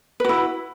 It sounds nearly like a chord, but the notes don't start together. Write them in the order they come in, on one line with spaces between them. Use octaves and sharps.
B4 F#4 E4